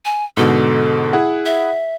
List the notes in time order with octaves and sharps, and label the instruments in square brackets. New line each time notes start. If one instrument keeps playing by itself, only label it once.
[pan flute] G#5
[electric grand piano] G#2 B2 D3 [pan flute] A4
[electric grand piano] E4 G#4 F#5
[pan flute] E5